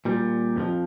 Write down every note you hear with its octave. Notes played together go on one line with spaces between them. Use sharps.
A#2 G3
F2 D3 F3